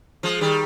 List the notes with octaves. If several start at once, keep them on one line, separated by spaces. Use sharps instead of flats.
F3 G#3
D#3 G3